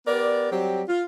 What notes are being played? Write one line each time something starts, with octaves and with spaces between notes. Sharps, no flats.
B3 G4 A#4 D5
F#3 G3 C4 G4
F4